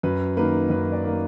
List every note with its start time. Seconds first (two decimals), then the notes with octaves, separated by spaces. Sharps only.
0.03 F#2 B4
0.37 D#3 A#3 B4
0.70 F#2 B4
0.92 D5
1.03 D#3 A#3